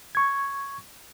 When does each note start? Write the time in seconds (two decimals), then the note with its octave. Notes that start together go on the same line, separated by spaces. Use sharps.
0.15 C#6 G#6